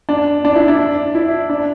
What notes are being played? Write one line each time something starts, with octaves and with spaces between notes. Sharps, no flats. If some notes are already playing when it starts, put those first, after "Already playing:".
D4
D4
E4
D4
E4
D4